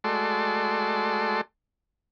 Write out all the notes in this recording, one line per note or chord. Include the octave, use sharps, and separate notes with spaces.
G#3 A3 F#4 A4 D5 C6